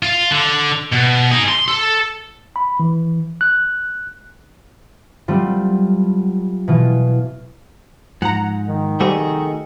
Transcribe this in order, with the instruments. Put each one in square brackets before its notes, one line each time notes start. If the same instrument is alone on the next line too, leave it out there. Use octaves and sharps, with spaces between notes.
[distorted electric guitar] F4
D3
B2
D#4 G#4
C6
A4
[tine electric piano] B5
E3
F#6
[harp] F#3 G3 A3 C4 F4
B2 E3 F4
[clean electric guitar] G#2 [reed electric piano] F3 [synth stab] F#5 A#5
[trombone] D#3
[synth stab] C3 G3 [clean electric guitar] A3 F#4 G#4